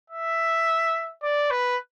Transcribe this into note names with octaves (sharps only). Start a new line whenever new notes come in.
E5
D5
B4